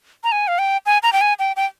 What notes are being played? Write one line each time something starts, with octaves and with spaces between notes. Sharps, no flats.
A#5
G#5
F5
G5
G#5
A#5
G5
G#5
G5
G5